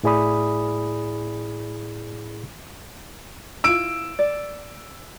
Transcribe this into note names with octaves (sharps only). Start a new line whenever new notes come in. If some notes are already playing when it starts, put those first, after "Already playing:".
A2 E4 G#4 D5 B5 D#6
E4 F4 E6 D7
D5